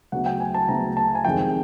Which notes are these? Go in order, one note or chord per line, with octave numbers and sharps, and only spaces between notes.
D2 C#3 F#3 B3 F#5
G5
G#5
A5
D2 C#3 F#3 B3 A#5
A5
G#5
F2 C3 D#3 G#3 G5